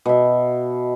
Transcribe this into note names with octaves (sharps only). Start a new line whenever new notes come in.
B2 E5